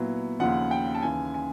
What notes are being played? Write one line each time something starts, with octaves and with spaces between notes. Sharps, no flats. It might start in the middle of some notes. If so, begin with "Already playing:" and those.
Already playing: A#2 F#3 B3 E4
D#2 C#3 F3 F#5
G5
A5
D#2 C#3 E3 G#5
G#5